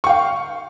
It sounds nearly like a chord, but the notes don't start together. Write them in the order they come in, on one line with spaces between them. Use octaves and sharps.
C#6 G5 F5